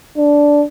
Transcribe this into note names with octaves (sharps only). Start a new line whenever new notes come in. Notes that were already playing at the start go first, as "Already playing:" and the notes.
D4